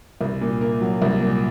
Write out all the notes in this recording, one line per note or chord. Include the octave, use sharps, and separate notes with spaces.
C2
A#2
A#3
F#3
C2
A#2